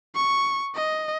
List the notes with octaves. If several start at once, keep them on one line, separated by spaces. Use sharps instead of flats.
C#6
D#5